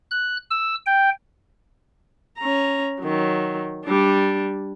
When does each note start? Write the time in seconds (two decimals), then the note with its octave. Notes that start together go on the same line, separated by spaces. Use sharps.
0.11 F#6
0.50 E6
0.86 G5
2.38 C#4 A#5
3.02 D#3 F#3
3.85 G3 D4